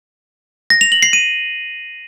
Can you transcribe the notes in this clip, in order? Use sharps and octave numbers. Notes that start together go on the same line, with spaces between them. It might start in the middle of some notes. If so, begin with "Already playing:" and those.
A#6
F7
F#7
C7
D#7